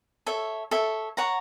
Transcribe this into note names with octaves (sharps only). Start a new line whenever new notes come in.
A4 C#5 E5
A4 C#5 E5
C#5 F#5 A#5